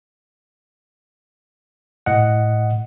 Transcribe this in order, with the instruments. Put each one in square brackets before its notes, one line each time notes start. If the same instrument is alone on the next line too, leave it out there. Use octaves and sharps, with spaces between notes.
[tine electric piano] A2 D#5 F#5